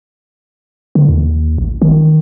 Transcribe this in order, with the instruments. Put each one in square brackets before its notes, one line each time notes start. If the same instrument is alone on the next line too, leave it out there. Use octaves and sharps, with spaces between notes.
[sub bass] D3
D#2
A1
D#3